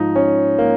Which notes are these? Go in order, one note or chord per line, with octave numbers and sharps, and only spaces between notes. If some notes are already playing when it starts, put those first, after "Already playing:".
Already playing: G#2 F3 D#4
C#4
A#3